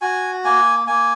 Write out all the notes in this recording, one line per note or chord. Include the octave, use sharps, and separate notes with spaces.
F#4 G#5
A#3 G#5
A#3 G#5